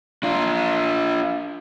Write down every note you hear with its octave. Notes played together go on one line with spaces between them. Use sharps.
D4 F4